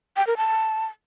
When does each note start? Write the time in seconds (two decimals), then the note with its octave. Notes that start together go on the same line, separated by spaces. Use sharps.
0.17 G5
0.27 A#4
0.37 A5